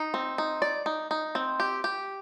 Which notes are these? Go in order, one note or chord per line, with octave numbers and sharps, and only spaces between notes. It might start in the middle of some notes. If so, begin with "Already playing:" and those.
Already playing: D#4
C4
D#4
D5
D#4
D#4
C4
G4
G4